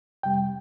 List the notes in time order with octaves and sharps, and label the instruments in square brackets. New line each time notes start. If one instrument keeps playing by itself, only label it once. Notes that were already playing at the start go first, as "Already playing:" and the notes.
[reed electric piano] F2 C3 G3 G5